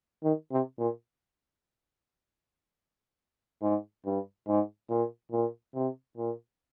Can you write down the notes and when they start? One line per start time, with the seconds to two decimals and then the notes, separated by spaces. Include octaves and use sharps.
0.23 D#3
0.52 C3
0.79 A#2
3.62 G#2
4.05 G2
4.47 G#2
4.90 A#2
5.32 A#2
5.75 C3
6.17 A#2